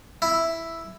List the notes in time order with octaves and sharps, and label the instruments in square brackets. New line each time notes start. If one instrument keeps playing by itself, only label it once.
[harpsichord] E4